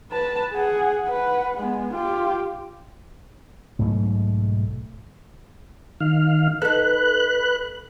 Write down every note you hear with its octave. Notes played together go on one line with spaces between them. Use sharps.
B4 A5
G#4 F#5
B4 F#5
G#3 B3
F4 G4
B1 G#2 B2 A3
D#3 F5
D#4 A4 B4 F#6